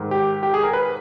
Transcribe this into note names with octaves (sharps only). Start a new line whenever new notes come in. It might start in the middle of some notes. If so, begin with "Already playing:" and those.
Already playing: G#2 D#3
G4
G4
G#4
A#4
B4